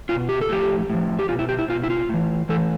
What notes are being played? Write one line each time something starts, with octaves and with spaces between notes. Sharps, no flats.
B2 F4
G4
A4
A2 F3 G4
A2 F3
G4
B2 F4
E4
G4
E4
B2 F4
E4
F4
A2 E3
A2 E3 A4